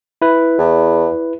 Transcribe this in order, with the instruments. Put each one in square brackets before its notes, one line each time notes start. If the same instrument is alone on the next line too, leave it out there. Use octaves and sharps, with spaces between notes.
[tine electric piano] E4 B4
[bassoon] E2